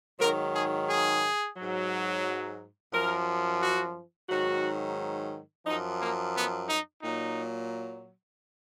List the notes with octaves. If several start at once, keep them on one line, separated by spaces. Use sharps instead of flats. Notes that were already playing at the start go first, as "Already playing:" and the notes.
G#2 D#3 F#3 A#4
G#4
G#4
G#2 F#3
F#2 F3 A#4
F#4
G#2 D#3 F#3 F#4
F#2 F3 D#4
A#3
B3
D#4
A#2 F#3 D#4